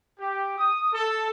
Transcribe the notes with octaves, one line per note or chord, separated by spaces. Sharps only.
G4
D#6
A4